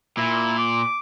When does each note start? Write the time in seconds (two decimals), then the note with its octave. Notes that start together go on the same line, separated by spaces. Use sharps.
0.17 A#2 E4
0.58 D6